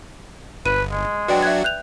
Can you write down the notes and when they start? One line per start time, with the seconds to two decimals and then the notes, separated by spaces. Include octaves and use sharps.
0.66 G1 B4 D#7
0.91 G#3
1.28 F#3 D4 F#4 B4 D5 G5
1.42 E5 F#6 G#6
1.64 F#6 G6 F7